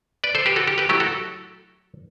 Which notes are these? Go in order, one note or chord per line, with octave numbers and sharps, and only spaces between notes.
B4 D5
A4 C5
G4 B4
F#4 A4
G4
G4 B4
F#3 A3 E4 G4
F#4 A4